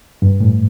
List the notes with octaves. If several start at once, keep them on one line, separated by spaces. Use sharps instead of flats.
G2
A2